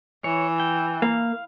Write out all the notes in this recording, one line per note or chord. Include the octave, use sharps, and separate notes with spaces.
E3 C#5
G5
A#3 F5